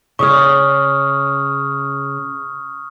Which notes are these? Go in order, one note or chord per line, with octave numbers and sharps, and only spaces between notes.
C#3 C#5 C#6 D#6 F6